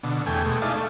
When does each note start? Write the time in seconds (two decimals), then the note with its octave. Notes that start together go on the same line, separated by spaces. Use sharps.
0.03 B2 D3
0.26 E2 A3 G5 G#5
0.45 B2 G#3 A3
0.62 D#4 E4 G#4 D5 F5 A5
0.75 A3